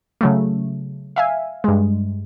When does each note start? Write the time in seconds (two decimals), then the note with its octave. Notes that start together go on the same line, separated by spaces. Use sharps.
0.21 C#3 F#3 A3
1.16 E5 F5 G#5
1.64 G2 G#3